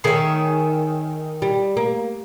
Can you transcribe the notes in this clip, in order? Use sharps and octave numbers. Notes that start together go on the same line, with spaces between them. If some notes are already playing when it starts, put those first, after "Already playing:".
D#3 G#4 C#5 E5 G#5
G3
A#3